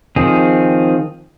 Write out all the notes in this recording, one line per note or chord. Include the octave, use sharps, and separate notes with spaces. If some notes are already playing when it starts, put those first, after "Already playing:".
D#3 F3 C4 G#4